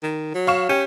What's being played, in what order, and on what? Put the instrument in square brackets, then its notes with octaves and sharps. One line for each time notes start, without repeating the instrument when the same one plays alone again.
[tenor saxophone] D#3
F#3
[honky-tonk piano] F5 C#6 E7
[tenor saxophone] C#4 [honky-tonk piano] G4